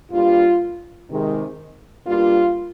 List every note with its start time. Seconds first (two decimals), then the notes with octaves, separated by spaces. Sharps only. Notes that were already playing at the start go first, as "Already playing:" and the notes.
0.12 G2 G3 A#3 F4
1.09 C3 D#3 G#3
2.06 G2 G3 A#3 F4